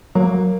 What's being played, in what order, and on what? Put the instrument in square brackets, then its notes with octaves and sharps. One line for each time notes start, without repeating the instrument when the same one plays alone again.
[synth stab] F#3 [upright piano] A#3